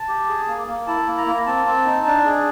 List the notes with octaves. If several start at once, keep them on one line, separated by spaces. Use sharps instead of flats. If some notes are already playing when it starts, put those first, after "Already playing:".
Already playing: A5
G4
G#4
A#3
A#3
E4 A5
A#3
A#5
A#3
C4 A5
C4
D#4
D4
G#4